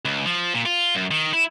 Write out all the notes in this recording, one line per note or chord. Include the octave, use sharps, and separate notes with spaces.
C#2
F3
A#2
F4
F#2
D#3
E4